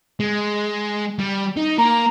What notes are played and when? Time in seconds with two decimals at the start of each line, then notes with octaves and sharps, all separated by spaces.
0.20 G#3
1.19 G3
1.57 D#4
1.78 A#3 A#5